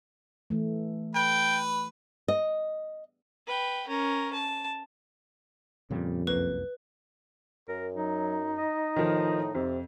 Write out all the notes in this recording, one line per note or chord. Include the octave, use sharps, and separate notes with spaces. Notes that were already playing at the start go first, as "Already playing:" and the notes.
E3 A3
B4 G5
D#5
B4 G5
C#4 A#4
A5
F2 A#2 C#3 G3
C2 F#2 A#3 B4
F#2 A#4
F#3 D#4
D#5
A2 D#3 F3
F2 C3